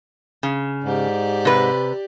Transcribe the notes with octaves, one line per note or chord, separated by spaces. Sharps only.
C#3
G#2 G4 D5
C3 B4